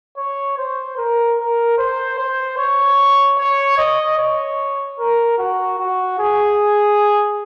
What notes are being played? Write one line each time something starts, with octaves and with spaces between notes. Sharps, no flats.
C#5
C5
A#4
A#4
C5
C5
C#5
C#5
D#5
C#5
A#4
F#4
F#4
G#4